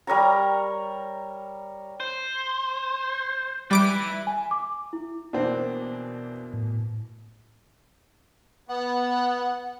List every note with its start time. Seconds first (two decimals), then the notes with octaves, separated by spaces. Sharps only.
0.07 G3 A#4 C#5 A#5
2.00 C5
3.71 G3 E4 B4 D6 D7
4.27 G#5
4.51 D6
4.93 E4
5.33 B2 E3 A#3 C4 D4
6.53 A2
8.69 B3 F#5